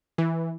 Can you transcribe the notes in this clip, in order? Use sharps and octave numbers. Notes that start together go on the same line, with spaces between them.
E3